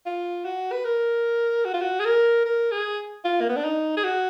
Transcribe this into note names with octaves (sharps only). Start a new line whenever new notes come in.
F4
F#4
B4
A#4
F#4
F4
F#4
G#4
A#4
A#4
G#4
F4
A#3
B3
D4
D#4
G#4
F#4